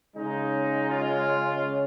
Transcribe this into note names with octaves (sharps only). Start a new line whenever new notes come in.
C#3 G#3 C#4 D#4
F4